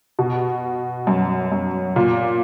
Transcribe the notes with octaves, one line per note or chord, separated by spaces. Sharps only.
B2
F#2
F#2
A#2